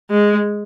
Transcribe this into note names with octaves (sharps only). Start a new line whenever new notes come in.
G#3